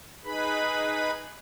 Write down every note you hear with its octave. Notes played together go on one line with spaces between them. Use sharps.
D#4 G#4 B4 B5